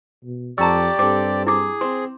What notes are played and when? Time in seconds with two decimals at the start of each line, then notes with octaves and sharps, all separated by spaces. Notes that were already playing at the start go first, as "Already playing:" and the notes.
0.25 B2
0.58 F2 G4 D5 A5 A#5 C#6 E6
0.99 G2 C4 A4 D6
1.47 E4 G#4 D6
1.81 C4 C6